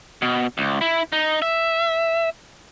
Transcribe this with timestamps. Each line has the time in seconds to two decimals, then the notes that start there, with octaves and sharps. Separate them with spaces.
0.22 B2
0.58 C#2
0.81 E4
1.13 D#4
1.42 E5